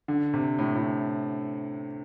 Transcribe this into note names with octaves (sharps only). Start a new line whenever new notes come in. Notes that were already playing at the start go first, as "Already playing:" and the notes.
D3
C3
A2
A2